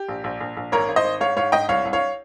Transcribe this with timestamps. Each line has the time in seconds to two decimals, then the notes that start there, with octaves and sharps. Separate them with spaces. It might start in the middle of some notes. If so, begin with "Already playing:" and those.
Already playing: G4
0.09 A#1
0.24 A#1
0.41 A#1
0.57 A#1
0.72 G#1 A#4 C#5
0.88 G#1
0.96 C5 D#5
1.04 G#1
1.21 G#2 C#5 F5
1.37 G#2 C#5 F5
1.52 G#2 D#5 G5
1.69 C2 C#5 F5
1.85 C2
1.93 C#5 F5